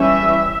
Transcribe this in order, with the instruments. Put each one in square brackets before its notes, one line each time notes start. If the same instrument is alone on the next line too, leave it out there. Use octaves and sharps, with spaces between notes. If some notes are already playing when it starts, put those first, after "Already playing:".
Already playing: [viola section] E3 G3 C#4 E5